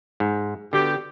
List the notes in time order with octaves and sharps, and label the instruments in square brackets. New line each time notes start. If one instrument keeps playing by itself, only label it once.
[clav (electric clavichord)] G#2
[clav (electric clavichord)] D3 [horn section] B3 F#4 G4